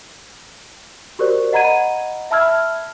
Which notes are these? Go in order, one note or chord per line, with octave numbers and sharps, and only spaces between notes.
F#4 G4 A#4 C5 D5
D#5 F#5 A#5 B5 G#6 D#7
E5 A5 B5 E6 F6 G#6